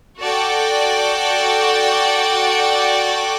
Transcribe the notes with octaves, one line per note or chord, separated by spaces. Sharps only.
F#4 A4 D5 G5